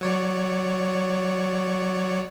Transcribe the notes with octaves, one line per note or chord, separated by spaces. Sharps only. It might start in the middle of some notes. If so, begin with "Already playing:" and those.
F#3 C#5 D5